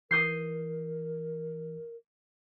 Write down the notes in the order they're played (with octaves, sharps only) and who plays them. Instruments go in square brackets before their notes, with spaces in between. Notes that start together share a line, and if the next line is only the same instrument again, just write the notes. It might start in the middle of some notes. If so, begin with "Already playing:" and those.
[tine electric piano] E3 [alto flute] A#4 [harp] D#6 G6 C7